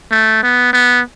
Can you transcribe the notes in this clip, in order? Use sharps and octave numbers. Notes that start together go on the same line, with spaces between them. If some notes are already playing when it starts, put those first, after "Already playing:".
A3
B3
B3